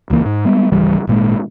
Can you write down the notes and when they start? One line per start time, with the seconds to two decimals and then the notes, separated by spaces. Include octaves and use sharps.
0.10 D#1 C#2 E3 A#3
0.25 G#2
0.45 G3 G#3 B3
0.72 G#1 C#2 E3 G3
1.07 G#1 A#2 G#3